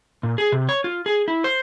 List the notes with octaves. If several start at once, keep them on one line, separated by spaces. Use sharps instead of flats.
A#2
G#4
C3
C#5
F4
G#4
E4
C5